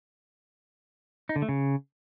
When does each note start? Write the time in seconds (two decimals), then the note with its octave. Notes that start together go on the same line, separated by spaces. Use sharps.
1.29 D#4
1.36 D3
1.42 A3
1.49 C#3